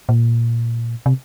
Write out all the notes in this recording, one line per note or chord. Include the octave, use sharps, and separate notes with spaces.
A#2
C3